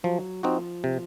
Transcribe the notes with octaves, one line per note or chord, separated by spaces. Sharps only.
F3 F#3
F3 C4 D#4 F#4
C3